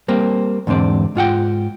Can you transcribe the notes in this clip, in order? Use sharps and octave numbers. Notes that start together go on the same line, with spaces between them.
G3 A#3 C4
E2 G#2 D3 C4 D5
G#2 F4 F#5 G5